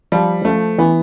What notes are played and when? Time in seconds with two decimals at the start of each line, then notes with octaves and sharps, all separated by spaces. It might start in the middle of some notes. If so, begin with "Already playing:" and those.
0.12 F3 G3
0.45 F3 A3
0.78 E3 B3